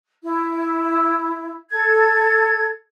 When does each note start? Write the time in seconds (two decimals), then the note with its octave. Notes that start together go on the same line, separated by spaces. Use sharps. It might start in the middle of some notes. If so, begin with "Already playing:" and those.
0.23 E4
1.70 A4 G#6